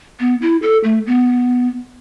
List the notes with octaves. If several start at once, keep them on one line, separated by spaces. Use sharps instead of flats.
B3
E4
A4
A3
B3